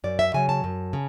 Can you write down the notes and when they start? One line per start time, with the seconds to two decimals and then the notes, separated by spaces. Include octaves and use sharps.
0.04 F#2 D5
0.19 E5
0.34 C#3 F#3 G#5
0.49 A5
0.64 F#2
0.93 C#3